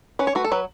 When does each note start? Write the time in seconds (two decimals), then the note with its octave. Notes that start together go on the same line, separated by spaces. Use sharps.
0.19 C#4 B4
0.27 C#5
0.35 A3 F#4 B4
0.44 A4
0.52 F#3 B4